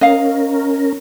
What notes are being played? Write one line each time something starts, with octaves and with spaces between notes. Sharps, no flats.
C#4 A#4 D#5 F5